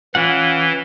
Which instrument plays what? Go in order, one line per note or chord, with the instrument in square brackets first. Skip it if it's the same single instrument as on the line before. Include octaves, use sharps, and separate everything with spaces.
[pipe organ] E3 [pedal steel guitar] C#4 F4 F#5